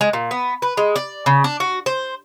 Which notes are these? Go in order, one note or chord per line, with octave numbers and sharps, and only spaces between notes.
G#3
A#2
B3
B4
G#3
D5
C#3
D4
F#4
C5